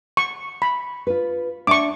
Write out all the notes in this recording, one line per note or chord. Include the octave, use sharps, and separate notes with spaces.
C#6
B5
F4 B4
D4 E5 C#6 D6